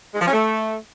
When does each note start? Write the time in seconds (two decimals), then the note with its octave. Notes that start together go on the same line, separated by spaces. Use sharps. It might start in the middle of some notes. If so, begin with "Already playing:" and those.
0.14 G#3
0.20 F3
0.26 C#4
0.33 A3